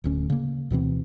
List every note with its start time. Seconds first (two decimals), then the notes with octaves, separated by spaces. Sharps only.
0.04 D1 D2 C#4
0.30 C#3 A#3
0.70 D2 B2 E3 C4